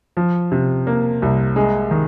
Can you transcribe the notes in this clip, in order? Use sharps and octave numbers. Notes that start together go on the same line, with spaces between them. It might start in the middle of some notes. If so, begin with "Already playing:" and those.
F3
C3
A#3
C2
G#3
D#3